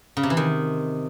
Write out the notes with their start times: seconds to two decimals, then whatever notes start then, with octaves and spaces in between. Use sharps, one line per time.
0.17 C#3
0.23 C3
0.30 E3
0.37 D#3